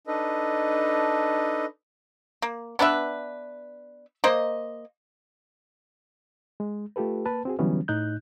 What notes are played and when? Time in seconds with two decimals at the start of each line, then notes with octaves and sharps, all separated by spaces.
0.07 D4 D#4 A4 B4 D#5
2.42 A#3
2.79 B3 D4 B4 E5
4.24 A#3 C5 D#5
6.60 G#3
6.96 A3 F4 G4 A4 B4
7.26 A#3 B4 A5
7.45 C4 F#4 G#4
7.59 D3 E3 F#3 G3 B3 C#4
7.88 A2 D#4 F#6 G6